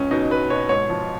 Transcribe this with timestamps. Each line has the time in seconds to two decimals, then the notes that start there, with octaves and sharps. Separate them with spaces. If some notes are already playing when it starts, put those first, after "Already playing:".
Already playing: C#2 C#4
0.11 B2 D#4
0.31 B2 B4
0.50 B2 C#5
0.69 G#2 C#5
0.90 F3